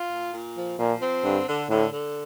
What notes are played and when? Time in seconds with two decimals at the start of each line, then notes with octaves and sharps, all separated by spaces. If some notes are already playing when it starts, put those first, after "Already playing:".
Already playing: F4
0.11 A#2
0.32 A#2
0.55 F3
0.79 A#2 F3
1.02 C4
1.24 G2 D3
1.47 D3
1.70 A2 D3
1.92 D3